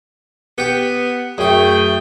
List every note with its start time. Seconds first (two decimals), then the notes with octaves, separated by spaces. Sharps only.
0.58 B3 G4 G5
1.38 F#2 A3 G#4 C#5 G5